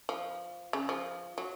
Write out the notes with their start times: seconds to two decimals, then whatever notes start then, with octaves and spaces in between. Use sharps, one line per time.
0.09 F3
0.73 C#3
0.89 F3
1.38 F#3